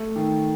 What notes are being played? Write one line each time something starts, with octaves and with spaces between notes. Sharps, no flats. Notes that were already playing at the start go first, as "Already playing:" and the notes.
Already playing: A3
D#3